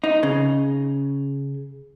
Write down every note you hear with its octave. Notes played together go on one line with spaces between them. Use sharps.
D#4
C#3